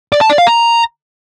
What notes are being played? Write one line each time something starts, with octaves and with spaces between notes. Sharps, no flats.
D5
A5
D5
F5
A#5